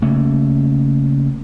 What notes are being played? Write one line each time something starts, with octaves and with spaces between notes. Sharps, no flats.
C#3 A3 A#3 C#4